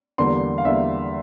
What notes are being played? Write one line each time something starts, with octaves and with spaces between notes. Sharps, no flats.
E2 D3 G3 A#3 C6
F5
E2 D3 G3 A#3 E5